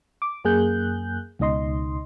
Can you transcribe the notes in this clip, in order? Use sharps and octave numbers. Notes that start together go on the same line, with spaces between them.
D6
F#2 A#3 G#4 F#6 G6
C#2 B2 D#4 D#5 C6